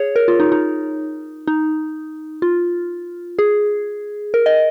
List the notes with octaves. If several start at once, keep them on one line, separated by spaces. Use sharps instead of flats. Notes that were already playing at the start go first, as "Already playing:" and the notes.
Already playing: G#4 C#5
A#4
F4
D#4
D#4
D#4
F4
G#4
A#4
D#5